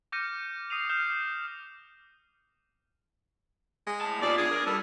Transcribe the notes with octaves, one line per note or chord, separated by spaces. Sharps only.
D6 F6 G6 A#6 C#7 D#7
D#6 C7 D#7 F7
D6 F6 G6 C7 E7 F7
G#3
A2 A5
D#2 B3 F4 D5
D4 G#4
A#4
G3 A4